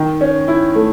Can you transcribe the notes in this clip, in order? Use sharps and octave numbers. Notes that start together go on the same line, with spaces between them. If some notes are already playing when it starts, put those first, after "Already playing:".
Already playing: D#3
C#4
E4
A3